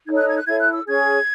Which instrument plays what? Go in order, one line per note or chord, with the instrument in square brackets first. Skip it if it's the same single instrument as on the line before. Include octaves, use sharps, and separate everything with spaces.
[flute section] D#4 A4 C#5 G#6
F#6
G#6
F#6
E4 A4 C#5 G#6
F#6
E6
C#4 G#4 C#5 G#6